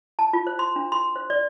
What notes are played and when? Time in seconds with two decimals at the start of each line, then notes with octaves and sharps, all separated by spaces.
0.19 A5
0.33 F4
0.47 C5
0.59 C6
0.76 D4
0.92 C6
1.16 C5
1.30 D5